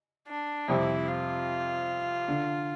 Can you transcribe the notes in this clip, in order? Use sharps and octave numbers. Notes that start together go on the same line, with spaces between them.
D4
F2 C3 G3 C4 E4
F4
D3